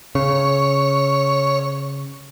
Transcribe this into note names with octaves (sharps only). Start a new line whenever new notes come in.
C#3 C#5